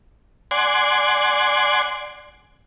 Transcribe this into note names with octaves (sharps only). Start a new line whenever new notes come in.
D5 F#5 G#5 C6